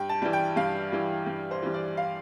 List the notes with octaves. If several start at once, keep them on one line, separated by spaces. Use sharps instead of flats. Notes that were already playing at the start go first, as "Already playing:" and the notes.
Already playing: G2 G5
A5
E3 G3
G5
G2 F5
E3 G3
G2
C5
E3 G3
D5
F5